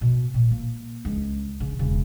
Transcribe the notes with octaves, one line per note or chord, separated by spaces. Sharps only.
B2
A#2
A#3
C#2
C#3
E1 C#3